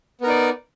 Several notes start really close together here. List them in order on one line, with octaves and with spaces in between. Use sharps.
B3 A#4 D#4 D5